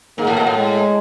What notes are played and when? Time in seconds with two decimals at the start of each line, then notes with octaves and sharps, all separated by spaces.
0.18 G#2 A#3
0.27 A2
0.37 B2
0.47 A2
0.55 G#3